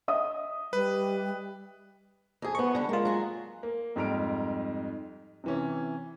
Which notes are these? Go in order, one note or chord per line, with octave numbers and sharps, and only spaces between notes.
D#5 E5 D#6
G3 B4
F2 G#4
F3 B3 C#6
D3 G3
G#3 A#3 F4
F#3 G#4
A#3
F2 G#2 G3 A#5 F6 D7
C3 E3 C#4